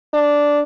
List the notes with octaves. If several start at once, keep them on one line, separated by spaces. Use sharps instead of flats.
D4